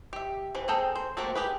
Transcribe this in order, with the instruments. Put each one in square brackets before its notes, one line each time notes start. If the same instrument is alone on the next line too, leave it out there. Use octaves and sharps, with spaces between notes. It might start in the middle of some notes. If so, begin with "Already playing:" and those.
[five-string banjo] G4 E5
E3 C4 B4
C4 G#4 A4 G5 A#5
C5
A3 A#3 C4 F#4 A4
G4 G#4 B4